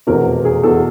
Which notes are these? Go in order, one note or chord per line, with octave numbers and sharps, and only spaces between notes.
F1 E2 B2 A#4
G#4
E2 B2 A4